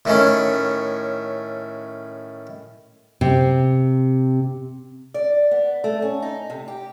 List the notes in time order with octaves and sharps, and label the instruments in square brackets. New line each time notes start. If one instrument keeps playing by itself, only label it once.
[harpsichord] A2 D#3 C#4
[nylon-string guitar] C3
[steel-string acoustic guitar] D5
B3
A3
C#4
D#4
C3
G4